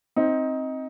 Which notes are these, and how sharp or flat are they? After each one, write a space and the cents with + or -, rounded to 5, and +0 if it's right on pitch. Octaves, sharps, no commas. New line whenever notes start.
C4 +10 D#4 +15